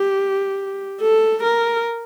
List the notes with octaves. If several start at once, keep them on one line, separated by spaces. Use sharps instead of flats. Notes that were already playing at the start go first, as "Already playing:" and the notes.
Already playing: G4
A4
A#4